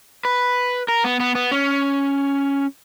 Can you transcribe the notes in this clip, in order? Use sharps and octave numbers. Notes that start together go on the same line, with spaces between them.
B4
A#4
B3
B3
B3
C#4